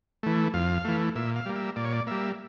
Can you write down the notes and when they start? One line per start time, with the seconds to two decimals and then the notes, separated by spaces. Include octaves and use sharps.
0.23 E3 A3
0.54 F2 F5
0.85 E3 A3
1.15 A#2 E5
1.36 F5
1.46 G3 A#3
1.56 E5
1.76 A#2 D5
1.85 C#5
1.93 D5
2.07 G3 A#3 E5